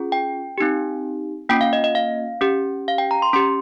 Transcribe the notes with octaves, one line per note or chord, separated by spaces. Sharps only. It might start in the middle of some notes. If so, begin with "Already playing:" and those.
Already playing: C#4 F4 G#4
G5
C4 D#4 G4
A#3 C#4 F4 G5
F5
D#5
D#5
F5
C#4 G4
F5
G5
A#5
C6
C#4 G4 C6